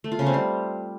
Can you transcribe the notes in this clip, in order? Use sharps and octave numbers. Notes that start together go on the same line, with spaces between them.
A3
F4
C#3
C4
G3